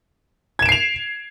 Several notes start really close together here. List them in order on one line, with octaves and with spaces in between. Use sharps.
G#6 E7 D7 C7 F7